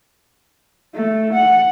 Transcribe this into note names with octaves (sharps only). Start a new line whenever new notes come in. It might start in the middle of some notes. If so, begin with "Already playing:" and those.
A3
F#5